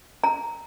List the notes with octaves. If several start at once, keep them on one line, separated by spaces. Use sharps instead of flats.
A#5